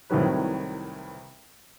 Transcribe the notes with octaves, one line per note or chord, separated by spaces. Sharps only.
C2 A2 D#3 F#3 B4